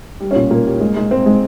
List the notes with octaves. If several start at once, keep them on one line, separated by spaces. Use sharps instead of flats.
G3
C#4
A#2
A#2 A#3
G3
G#3
G#3
G#3 C4
G#3